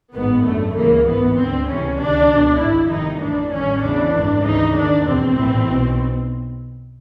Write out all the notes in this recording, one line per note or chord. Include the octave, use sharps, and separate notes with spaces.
A1 G#2 D#3 B3
G#1 F#2 D3 A3
C#2 C#3 E3 A#3
A1 G#2 E3 B3
D2 D3 C4
C#2 C3 E3 C#4
C#2 C3 D#3 D4
C#2 B2
G#1 G#2 D#3 E4
G1 F2 C3 D#3 D#4
A1 A2 E3 D4
A1 G2 D#3 C#4
E2 C#3 E3 D4
G#1 F#2 D3
D2 C#3 E3 D#4
D#2 D#3 D4
E2 B2 C4
A#1 A2 E3
B1 B2